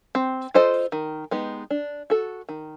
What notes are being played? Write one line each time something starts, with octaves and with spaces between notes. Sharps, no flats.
C4
F4 A4 C5 D#5
D#3
G#3 B3 D#4 G4
D4
F#4 A4
D#3